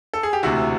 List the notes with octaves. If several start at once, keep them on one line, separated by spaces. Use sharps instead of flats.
A4
G#4
G4
E1 D2 C3 E4 F#4